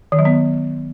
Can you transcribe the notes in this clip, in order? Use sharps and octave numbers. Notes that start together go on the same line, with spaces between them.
D#3
F#3
B3